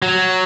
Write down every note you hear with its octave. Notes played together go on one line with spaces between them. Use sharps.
F#3